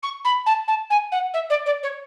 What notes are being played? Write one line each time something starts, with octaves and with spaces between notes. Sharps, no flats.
C#6
B5
A5
A5
G#5
F#5
E5
D5
D5
C#5